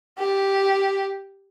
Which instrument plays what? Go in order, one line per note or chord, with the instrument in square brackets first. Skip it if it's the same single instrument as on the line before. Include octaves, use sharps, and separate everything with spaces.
[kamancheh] G4